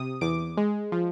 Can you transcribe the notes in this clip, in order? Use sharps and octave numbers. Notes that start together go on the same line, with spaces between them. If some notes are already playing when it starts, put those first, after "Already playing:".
Already playing: C3 D#6
E2 D6
G#3
F3